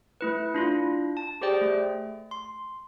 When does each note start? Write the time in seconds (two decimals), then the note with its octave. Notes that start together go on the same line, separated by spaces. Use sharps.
0.21 A3 E4 B4
0.54 D4 E4 F4
1.17 A5
1.41 G4 G#4 C5 D5 G5
1.62 A3
2.31 C6